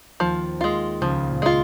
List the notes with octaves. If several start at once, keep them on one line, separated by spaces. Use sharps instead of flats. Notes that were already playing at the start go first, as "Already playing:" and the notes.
D#2 D#3 F3
D#2 D#3 G#3 F4
C#2 C#3 F3
A#2
G#3 F4